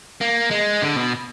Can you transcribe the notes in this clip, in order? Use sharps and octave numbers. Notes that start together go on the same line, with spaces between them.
A#3
G#3
D3
B2